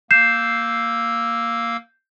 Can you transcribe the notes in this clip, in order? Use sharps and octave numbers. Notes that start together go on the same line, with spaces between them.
A#3 F5 E6 G6 C7 E7